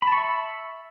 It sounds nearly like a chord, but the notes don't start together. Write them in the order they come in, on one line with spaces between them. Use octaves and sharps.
B5 A5 C#6 E5